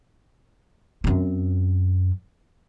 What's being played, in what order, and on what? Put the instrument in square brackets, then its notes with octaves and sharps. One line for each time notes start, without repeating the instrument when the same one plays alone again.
[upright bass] F#2 C4